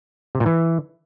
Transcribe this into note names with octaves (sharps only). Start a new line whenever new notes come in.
C3
A#2
E3